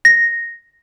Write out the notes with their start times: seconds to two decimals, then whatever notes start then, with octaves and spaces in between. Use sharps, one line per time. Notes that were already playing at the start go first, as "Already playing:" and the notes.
0.05 A#6